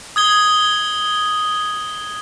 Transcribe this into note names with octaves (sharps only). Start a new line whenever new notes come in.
D#6 G#6 G7